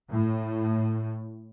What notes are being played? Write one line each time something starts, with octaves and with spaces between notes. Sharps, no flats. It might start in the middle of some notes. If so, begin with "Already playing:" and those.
A2